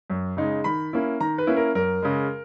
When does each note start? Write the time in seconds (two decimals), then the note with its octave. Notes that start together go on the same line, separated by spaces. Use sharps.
0.10 F#2
0.37 C#3 G#3 D#4
0.64 D#3 B5
0.93 A#3 C#4 E4
1.20 D#3 A#5
1.38 B4
1.47 A#3 C#4 E4
1.56 A#4
1.75 F#2 A#4
2.02 C#3 G#3